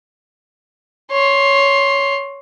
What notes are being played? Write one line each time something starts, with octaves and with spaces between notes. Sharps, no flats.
C#5 C6